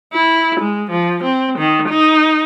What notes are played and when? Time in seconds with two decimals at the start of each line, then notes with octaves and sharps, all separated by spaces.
0.13 E4
0.59 G#3
0.91 F3
1.23 C4
1.58 D#3
1.89 D#4